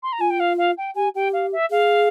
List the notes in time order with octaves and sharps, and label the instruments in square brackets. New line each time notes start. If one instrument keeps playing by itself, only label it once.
[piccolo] C6
A#5
[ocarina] F4 [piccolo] G#5
[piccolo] G5
F5
F5
G5
[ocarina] G4 [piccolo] G#5
[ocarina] G4 [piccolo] G5
[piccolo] F5
E5
[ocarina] G#4 [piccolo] F5